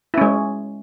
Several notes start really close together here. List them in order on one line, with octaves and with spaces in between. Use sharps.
E4 C#4 G#3